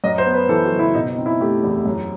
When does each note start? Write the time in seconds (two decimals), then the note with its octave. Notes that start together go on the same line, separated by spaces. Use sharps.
0.04 F#2 D#5
0.18 C5
0.26 B3
0.34 B4
0.49 E3 A4
0.64 F#4
0.72 F#1
0.79 E4
0.95 B2 D#4
1.10 D#4
1.17 C4
1.26 E4
1.41 A3 G4
1.63 E2
1.86 F#2